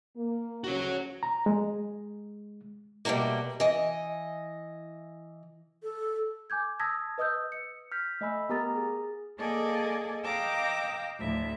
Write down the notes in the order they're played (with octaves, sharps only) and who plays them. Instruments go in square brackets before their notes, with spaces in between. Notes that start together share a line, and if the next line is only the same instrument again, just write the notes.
[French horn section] A#3
[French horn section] D2 C#3 C#4 [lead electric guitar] F#4 C#5
[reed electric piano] A#5
G#3
[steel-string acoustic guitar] B2 D#3 G3 A3 A#3
E3 D#5
[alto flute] A4
[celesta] G#5 D6 G6 G#6
A5 D#6 E6 G#6 A#6 B6
B4 D#5 D#6 E6 G6
C#7
[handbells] F6 G6 B6
A3 D#5 G#5 B5 E6
B3 G4 A#4 A#5 D#6 A6
G#4
[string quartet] A#3 G#4 A4 D5 D#5 G#5
D#5 F5 G5 A#5 D6 E6
D2 A2 E5